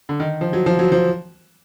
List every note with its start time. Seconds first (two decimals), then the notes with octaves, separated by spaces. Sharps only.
0.09 D3
0.20 D#3
0.41 F3
0.53 F#3
0.66 F3
0.79 F#3
0.92 F3